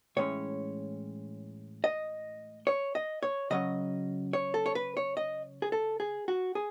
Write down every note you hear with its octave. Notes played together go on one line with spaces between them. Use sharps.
A2 E3 G#3 C#4 C#5
D#5
C#5
D#5
C#5
C#3 F#3 C#4 D#5
C#5
A4
C#5
B4
C#5
D#5
G#4
A4
G#4
F#4
G#4